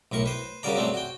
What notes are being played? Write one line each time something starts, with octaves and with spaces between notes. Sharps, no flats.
B1 A2 A#4 C#6
B4 C5
C#3 G3 F#4 A#4 D5 A#5
F#3 G3 A3 C4 F#4
F#4 G5